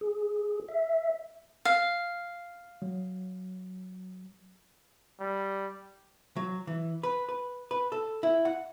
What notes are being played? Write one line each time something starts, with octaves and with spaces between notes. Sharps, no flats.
G#4
E5
F5
F#3
G3
F#3
E3
B4
B4
B4
A4
E4
F#5